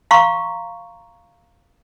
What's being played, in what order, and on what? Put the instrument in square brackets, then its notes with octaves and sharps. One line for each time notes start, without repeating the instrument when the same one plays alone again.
[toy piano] F5 A#5 C6 C#6